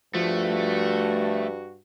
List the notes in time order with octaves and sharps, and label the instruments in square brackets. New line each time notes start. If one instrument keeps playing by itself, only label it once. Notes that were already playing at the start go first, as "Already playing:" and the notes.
[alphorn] G2 [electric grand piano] F3 [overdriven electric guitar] A3 [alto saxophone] F#4